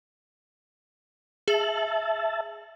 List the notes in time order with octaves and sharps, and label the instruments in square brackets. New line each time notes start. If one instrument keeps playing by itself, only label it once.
[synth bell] G#4 F#7 [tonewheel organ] E5 A5